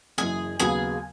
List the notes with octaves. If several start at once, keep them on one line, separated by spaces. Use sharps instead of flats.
F#1 F#2 E3 G#4 G#5
D#2 C#3 F#3 B3 G#4 G#5